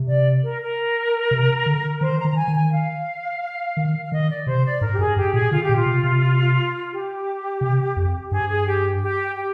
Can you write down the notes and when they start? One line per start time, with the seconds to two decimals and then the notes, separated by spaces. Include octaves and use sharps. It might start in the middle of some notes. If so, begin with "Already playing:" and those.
Already playing: C3
0.09 D5
0.44 A#4
0.62 A#4
1.31 C3
1.66 D3
2.01 D#3 C5
2.19 A#5
2.25 D#3
2.29 A#5
2.36 G#5
2.48 D#3
2.54 G#5
2.71 F5
3.77 D#3
4.04 F5
4.11 D#3 D#5
4.29 D5
4.46 C3 C5
4.64 D5
4.81 G#2 A#4
4.93 G4
4.99 G2 G#4
5.16 G2 G4
5.33 A#2 G#4
5.51 D3 F4
5.63 G4
5.69 A#2
5.77 F4
5.86 C3
6.04 C3
6.91 G4
7.61 C3
7.97 F2
8.31 G2 G#4
8.49 G#4
8.67 G4
9.02 G4
9.36 G4